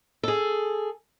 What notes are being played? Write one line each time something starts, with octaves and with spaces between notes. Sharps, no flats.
G#4 A4